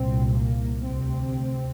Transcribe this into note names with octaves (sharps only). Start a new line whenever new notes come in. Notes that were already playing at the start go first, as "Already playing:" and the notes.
Already playing: C2 A#2 C4
A#3
D2 C3 C4